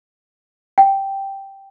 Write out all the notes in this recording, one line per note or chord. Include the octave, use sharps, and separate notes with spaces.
G5